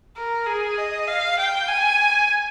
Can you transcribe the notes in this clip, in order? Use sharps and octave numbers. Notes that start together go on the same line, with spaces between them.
A#4
G#4
D#5
F5
G5
G#5